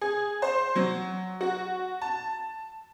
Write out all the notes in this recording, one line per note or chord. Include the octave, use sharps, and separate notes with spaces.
G#4
C5
F#3
F#4
A5